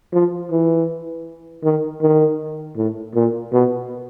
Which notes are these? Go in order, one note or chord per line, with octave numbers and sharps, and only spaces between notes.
F3
E3
D#3
D#3
A2
A#2
B2